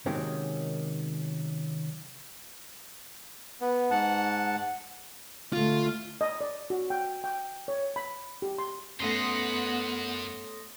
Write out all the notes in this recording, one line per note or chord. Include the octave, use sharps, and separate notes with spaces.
C3 D#3 F#3 G#3 A#3 C#4
B3
G#2 F#5 A5
D3 A3 F4
D#5
D5
F#4
G5
G5
C#5
B5
G4
C6
F#2 A3 B3 C#4 F#5 C6 D#6 A#6